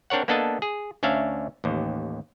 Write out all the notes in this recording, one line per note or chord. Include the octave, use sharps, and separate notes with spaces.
C4 D4 A#4 C#5 F#5
A#3 B3 D4 A4 D#5 A5
G#4
D2 C#4 D4 E5 F5
A1 D#2